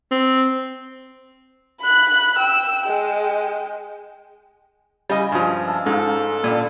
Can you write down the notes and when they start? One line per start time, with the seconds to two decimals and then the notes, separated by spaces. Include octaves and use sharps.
0.11 C4
1.81 B5 F#6
2.38 G5 E6
2.84 G#3 G5
5.09 C#3 E3 G3 B4 D#5
5.32 G2 F3 G#3 G#4
5.67 E5 F5 A5
5.86 G#2 C#4 D#4 F4 A4
6.44 A#2 D3 G3